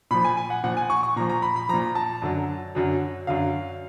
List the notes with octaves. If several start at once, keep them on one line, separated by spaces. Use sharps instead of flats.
A#2 F3 B5
G#5
G#5
F#5
A#2 F3 F#5
G#5
C#6
C#6
A#2 F3 A#5
A#5
B5
B5
A#2 F3 A#5
A5
F#2 D3 F#3
F#2 D3 F#3
F#2 D3 F#3 F5